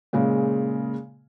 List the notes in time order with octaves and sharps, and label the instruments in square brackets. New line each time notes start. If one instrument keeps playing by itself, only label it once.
[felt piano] A#2 C#3 G#3